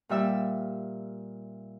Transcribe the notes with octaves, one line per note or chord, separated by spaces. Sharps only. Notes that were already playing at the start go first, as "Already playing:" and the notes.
A#2 G3 E5 E6